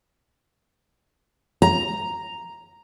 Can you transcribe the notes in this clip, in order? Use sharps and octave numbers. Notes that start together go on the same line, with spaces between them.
A#5